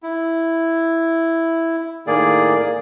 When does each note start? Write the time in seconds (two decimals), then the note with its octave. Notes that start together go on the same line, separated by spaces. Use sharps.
0.03 E4
2.07 A2 D#3 A#3 G#4 D5